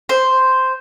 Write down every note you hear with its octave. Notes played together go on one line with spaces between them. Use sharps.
C5